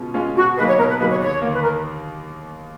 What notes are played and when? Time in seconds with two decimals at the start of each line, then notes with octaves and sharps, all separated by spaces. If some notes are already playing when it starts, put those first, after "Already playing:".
Already playing: B2 G#3 C#4 F4
0.14 G#3 C#4 F4
0.35 B2 F#4
0.57 F#3 A#3 D#4 G#4 B4
0.67 C#5
0.78 B2 A#4
0.89 B4
1.00 F#3 A#3 D#4 G#4 B4
1.10 C#5
1.20 D#2 C#5
1.42 D#3 A#3
1.54 B4
1.62 A#4